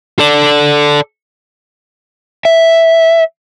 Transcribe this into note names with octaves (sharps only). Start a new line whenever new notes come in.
A4 D5
E5